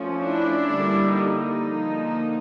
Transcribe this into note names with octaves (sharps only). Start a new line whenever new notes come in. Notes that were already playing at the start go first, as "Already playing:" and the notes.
Already playing: F3 A3 C#4
D4 E4
D3 G3 A#3
D#4
D3 F3 A#3